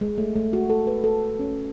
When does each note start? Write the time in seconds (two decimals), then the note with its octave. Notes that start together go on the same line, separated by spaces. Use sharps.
0.01 G#3
0.18 A3
0.36 A3
0.53 F#4
0.70 A4
0.87 B4
1.04 A4
1.39 C#4